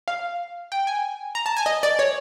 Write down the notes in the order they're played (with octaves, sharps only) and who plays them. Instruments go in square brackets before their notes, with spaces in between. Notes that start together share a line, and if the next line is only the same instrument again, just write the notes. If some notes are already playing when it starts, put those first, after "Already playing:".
[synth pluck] F5
G5
G#5
A#5
A5
G#5
D#5
D5
C#5